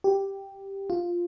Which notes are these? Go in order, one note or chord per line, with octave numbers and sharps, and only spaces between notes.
G4
F4